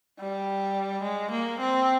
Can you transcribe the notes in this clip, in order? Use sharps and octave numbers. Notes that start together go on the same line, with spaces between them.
G3
G#3
A#3
C4